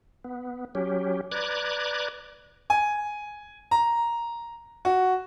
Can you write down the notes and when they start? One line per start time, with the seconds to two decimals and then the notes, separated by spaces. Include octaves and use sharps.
0.24 B3
0.75 F#3 C#4 G4
1.31 B4 D5 A#5 D6 F#6 G#6
2.70 G#5
3.71 A#5
4.85 F#4